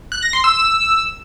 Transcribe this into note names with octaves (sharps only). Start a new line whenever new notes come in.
F#6
A#6
C6
E6
E6